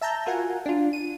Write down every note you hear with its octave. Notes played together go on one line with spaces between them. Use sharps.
E5 A5 A#5 G6
F4 F#4 A#4 F#5 G#5
D4 F4
D#7